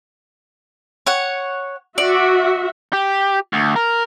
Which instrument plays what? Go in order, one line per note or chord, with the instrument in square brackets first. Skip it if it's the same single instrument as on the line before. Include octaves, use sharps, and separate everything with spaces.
[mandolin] C#5 F#5
[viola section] F#4 E5 [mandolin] D5
[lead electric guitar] G4
D2
A#4